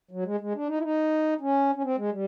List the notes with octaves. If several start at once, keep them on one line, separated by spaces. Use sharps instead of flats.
F#3
G#3
G#3
D4
D#4
E4
D#4
C#4
C#4
C4
G#3
G3